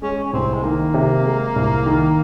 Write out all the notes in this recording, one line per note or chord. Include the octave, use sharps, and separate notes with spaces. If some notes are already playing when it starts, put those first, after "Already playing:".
G#3 C#4
C#4
C2 C4
G#3
D#3 A#3
C3
G#3
C2
D#3